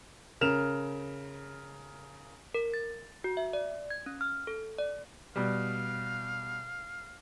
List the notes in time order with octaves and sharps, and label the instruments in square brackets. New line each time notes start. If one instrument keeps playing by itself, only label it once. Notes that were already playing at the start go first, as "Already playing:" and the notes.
[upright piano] C#3 A#4 F6 E7 F7
[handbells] A#4
A6
F#4
E5
D5
G#6
C#4
F6
A4
D5
[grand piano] B2 G3 [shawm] F5